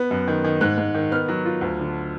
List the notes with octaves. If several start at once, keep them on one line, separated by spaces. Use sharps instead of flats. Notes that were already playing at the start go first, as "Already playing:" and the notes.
Already playing: B3
F#2
D#3
D#3
G#2 F#6
G#2
D#3
B3 F6
F#3
F4
D2
D3